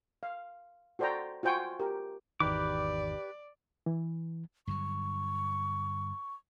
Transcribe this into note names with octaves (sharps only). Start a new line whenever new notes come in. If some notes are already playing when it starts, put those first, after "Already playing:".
F5
F#4 A4 C5 D5 G5 A#5
F4 F#4 C5 G5 G#5 C#6
G4 A#4
G#1 E2 D#3 G4 B4 D5 D6
E3
G2 D3 F#3 C#6